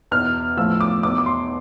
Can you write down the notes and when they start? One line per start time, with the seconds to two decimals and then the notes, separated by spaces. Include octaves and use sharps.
0.11 E2 B2 F6
0.57 A2 F3 E6
0.81 D6
1.03 E2 B2 D6
1.18 D6
1.26 C6